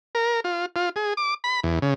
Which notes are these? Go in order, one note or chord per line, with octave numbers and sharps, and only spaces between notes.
A#4
F4
F4
G#4
D6
B5
E2
C#3